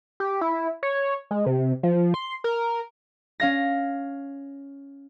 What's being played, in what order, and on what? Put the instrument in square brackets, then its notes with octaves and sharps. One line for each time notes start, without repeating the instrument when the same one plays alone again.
[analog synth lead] G4
E4
C#5
G#3
C3
F3
C6
A#4
[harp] C#4 F5 A#6